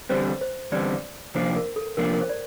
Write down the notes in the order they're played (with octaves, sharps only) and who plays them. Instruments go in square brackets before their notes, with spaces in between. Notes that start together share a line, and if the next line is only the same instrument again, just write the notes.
[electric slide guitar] E2 D3 G3 C4 [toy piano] C5
[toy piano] C5
[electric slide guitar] E2 D3 G3 C4 [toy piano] D5
[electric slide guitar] C3 F3 A#3 D4 [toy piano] C5
[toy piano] A#4
A4
[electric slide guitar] C3 F3 A#3 D4 [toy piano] A#4
[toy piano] A#4
C5
D5